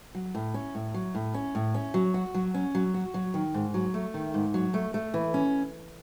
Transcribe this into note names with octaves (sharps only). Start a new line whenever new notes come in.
F#3
A2
C#4
A2
F#3
A2
C#4
A2
C#4
F#3
F#4
F#3
C#4
F#3
F#4
F#3
D#3
G#2
F#3
A3
D#3
G#2
F#3
A3
A3
E3
C#4